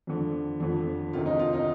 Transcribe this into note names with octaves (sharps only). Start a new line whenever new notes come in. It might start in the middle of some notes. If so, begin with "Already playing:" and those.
F2 D3 F3
F2 D3 F3
D2 C3 D#3 F4
D#4
F4
D#4